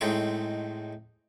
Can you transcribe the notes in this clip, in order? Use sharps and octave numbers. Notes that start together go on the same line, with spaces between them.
A2 G#3 C4 D#4 C#6